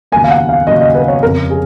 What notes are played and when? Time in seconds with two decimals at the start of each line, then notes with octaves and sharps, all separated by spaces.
0.12 D#2 C#3 F#3 A#3 G#5
0.24 F5
0.30 F#5
0.49 F5
0.67 D#2 C#3 F#3 A#3 D#5
0.81 D#5
0.95 B4
1.08 C#5
1.22 F1 F2 C#3 A#4
1.50 G#4